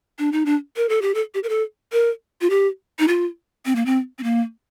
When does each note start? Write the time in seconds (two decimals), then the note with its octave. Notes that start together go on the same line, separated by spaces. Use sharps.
0.19 D4
0.32 D#4
0.46 D4
0.77 A#4
0.89 A4
1.02 G4
1.15 A4
1.34 G4
1.44 A#4
1.49 A4
1.92 A#4
2.41 F4
2.50 G4
2.99 D#4
3.08 F4
3.66 C4
3.76 A#3
3.86 C4
4.18 C4
4.23 A#3